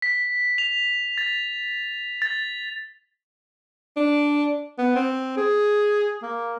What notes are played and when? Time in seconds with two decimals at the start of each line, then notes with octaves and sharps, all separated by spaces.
0.02 B6
0.58 F7
1.18 A6
2.22 A6
3.97 D4
4.79 B3
4.96 C4
5.37 G#4
6.22 A#3